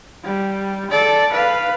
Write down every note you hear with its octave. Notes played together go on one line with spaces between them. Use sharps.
G3
A4 D5
B4 F5